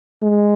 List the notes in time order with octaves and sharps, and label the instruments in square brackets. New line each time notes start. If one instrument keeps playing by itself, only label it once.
[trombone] G#3